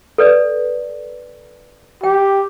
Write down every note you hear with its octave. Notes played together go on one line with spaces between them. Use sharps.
A4 B4 D5
G4 G5